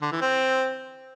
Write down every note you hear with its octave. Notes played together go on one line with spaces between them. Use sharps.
D3
E3
C4